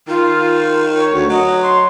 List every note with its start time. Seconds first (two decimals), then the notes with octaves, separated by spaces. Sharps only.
0.08 D#3 F4
0.96 C#5
1.14 D2
1.29 F#3 D#5
1.62 C6